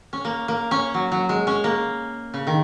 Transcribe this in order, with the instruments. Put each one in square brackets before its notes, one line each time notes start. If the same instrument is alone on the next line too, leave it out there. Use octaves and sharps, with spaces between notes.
[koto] C#4
A#3
A#3
C#4
F#3
F#3
G#3
C#4
A#3
C#3
D#3